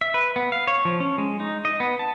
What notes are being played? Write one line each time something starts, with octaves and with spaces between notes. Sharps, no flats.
E5
B4
B3
F5
C#5
F3
C#4
G#3
D#4
D#5
B3
A5